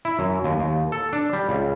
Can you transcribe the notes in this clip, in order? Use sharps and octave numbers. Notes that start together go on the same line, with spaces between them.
E4
F#2
D#2
D#2
A4
D4
G3
C#2